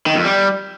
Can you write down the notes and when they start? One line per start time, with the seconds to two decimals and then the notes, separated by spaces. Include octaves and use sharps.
0.06 D#3
0.15 F2
0.24 G3